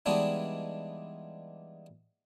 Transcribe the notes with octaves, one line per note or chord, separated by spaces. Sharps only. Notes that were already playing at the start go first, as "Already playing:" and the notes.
E3 G3 G#3 B3 D4 D#4